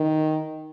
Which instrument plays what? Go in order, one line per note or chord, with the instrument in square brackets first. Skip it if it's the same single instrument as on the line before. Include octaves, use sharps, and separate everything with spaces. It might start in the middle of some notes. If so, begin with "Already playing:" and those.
Already playing: [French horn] D#3